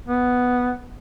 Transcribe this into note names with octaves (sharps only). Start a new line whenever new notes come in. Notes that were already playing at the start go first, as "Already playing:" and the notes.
B3